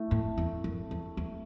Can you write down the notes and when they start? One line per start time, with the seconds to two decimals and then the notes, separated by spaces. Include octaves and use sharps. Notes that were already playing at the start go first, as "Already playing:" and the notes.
Already playing: A3 E4
0.11 A2
0.38 E2
0.64 F#2
0.91 E2
1.17 E2